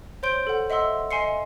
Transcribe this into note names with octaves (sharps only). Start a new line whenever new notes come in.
C5 C#5 C6 G6 D7 G7
A4 F#5
D#5 E5 F#5 C6 E6
D#5 E5 G#5 C6 C7 C#7